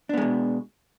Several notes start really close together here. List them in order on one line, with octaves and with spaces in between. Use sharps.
D4 B3 G#3 B2